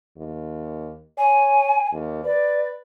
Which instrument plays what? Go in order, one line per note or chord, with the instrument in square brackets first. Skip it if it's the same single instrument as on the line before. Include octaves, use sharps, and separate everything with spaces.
[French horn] D#2
[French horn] C#5 [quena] G#5
[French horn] D#2
[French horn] B4 [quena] D5